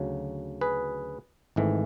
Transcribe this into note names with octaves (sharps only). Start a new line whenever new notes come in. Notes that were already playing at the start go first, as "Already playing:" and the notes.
Already playing: D2 C#3 F#3
G#4 B4
G#1 G#2 E3 A3